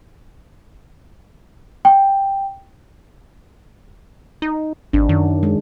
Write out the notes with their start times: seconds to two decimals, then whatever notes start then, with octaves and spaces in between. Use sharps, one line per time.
1.85 G5
4.42 D#4
4.93 G#1 D4
5.09 F#2 D#3
5.43 G#3